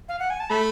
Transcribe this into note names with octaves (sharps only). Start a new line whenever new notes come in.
F5
F#5
G#5
A5
A3 B5